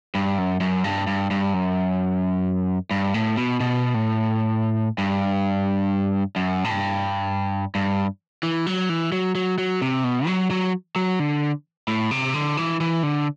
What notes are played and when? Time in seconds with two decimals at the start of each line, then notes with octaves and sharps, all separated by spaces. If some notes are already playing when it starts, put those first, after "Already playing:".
0.15 G2
0.38 F#2
0.61 F#2
0.84 G2
1.07 G2
1.31 G2
1.54 F#2
2.91 G2
3.14 A2
3.37 B2
3.60 B2
3.94 A2
4.98 G2
6.36 F#2
6.64 A2
6.71 G2
7.75 G2
8.43 E3
8.66 F#3
8.89 E3
9.12 F#3
9.35 F#3
9.58 F#3
9.82 C3
10.04 B2
10.27 F#3
10.51 F#3
10.96 F#3
11.19 D3
11.88 A2
12.11 C3
12.34 D3
12.57 E3
12.81 E3
13.03 D3